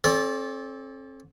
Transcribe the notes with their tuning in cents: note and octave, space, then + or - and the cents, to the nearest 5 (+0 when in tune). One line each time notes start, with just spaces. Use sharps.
C4 +40 A4 -25 D5 -20